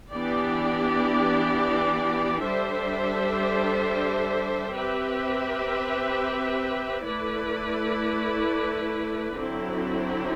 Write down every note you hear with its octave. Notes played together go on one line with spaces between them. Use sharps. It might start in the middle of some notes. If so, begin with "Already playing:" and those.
E3 B3 D4 G4 D5
G3 D4 A4 C5 E5
C4 G4 B4 E5
A3 E4 B4 D5
D3 F#3 C4 E4